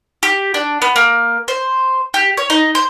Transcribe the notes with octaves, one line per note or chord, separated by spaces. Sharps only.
G4
D4
B3
A#3
C5
G4
C#5
D#4
C5